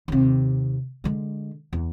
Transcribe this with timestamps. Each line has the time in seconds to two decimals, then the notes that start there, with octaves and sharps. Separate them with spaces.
0.08 D#2 C3
1.04 D3 G#3
1.73 E2